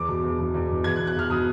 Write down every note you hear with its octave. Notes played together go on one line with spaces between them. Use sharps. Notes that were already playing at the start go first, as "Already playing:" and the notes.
Already playing: E2 D6
B2
E2
B2
E2
B2
E2 G#6
F#6
B2
F#6
E2 F6
B2 D#6